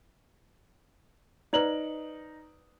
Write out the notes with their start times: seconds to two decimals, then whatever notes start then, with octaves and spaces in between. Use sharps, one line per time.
1.53 D#4 B4 C5 D5 A#5 F#7